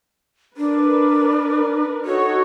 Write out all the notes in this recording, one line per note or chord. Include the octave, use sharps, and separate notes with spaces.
D4 A#4 B4
D#4 F#4 A4 C#5